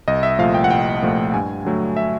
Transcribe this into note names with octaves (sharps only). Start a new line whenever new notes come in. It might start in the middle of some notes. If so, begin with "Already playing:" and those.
C2 D#5
E5
A#2 F3 A3 F5
G5
F#5
C2 G5
A#2 F3 A3
G2 G#5
D3 F#3 A3
E5